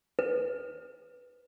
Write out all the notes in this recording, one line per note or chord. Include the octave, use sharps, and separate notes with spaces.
B4